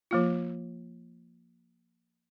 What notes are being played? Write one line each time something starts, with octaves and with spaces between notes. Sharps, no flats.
F3 A#3 F4